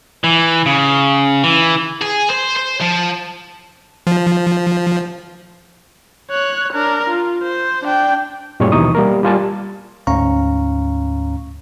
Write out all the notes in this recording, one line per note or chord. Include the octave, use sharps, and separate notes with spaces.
E3
C#3
E3
G#4
C5
C5
F3
F3
C#5 F#6
D4 A#4
F4
C5
D4 G5
F#2 A#2 G3 G#3 C#5
D#2 B2 E3 D#4 C#6 D#6
G3 A#3 A#4
G3 F4 G#5 A5
D2 G#2 C#4 F5 A#5 C#6